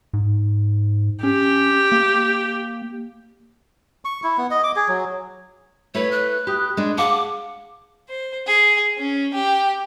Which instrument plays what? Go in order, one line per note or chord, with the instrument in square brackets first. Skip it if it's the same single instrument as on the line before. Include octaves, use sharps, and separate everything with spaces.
[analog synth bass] G#2
[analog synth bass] C#4 [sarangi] G4
[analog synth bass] A#3
[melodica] C#6
E4
B3
D#5
D6
G#4
F#3
[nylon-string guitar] A3 E4 B4 [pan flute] C#5
[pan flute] F#6
[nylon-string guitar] G4 [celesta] B5 D#6
[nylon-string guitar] G#3 D4
[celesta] G#4 F5 A5 [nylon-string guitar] F#5 [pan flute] D6
[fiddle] C5
G#4
C#4
G4